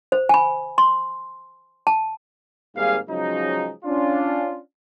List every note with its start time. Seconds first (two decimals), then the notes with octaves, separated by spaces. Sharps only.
0.12 C5
0.29 G#5 B5
0.78 C6
1.87 A5
2.75 G#1 G#2 G3 A#3 G#4 F5
3.08 C#3 F3 F#3 G#3 C#4 D#4
3.85 C#4 D4 F4